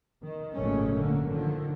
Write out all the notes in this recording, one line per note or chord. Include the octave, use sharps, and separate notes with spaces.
D#3
G#1 F#2 A#2 C#3 A3 C#4
D3 A#3
D3 D#3 F3